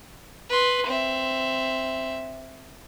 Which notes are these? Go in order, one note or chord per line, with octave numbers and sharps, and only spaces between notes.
B4 C6
C4 E5